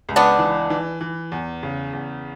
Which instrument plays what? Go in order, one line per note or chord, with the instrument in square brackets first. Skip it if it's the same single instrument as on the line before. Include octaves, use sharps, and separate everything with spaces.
[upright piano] C#2
[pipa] B3 D4
[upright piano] E3
E3
E3
E2
C#3
E2